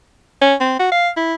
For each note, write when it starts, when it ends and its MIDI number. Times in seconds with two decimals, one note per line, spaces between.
0.42 0.55 61
0.61 0.75 60
0.79 0.88 66
0.92 1.09 77
1.17 1.34 64